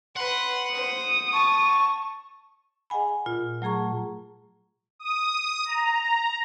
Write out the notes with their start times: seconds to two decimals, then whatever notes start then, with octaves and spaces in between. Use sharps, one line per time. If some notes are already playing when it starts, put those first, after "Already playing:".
0.16 B4 F#5 C6
0.74 C5 D#6
1.33 A5 C#6
2.90 G#4 D#5 F#5 G#5 B5
3.26 A#2 F4
3.62 F#3 A3 G#4 A#5 C#6
4.99 D#6
5.66 A#5